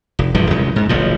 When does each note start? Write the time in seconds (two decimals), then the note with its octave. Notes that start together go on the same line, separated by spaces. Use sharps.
0.19 F1
0.35 E1 G2 E3 F3
0.50 C2 F#2 G#3
0.76 G#2
0.89 D1 A1 B2 F3